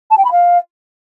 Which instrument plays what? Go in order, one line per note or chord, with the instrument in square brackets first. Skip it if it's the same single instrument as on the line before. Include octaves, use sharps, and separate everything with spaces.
[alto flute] A5
G5
B5
F5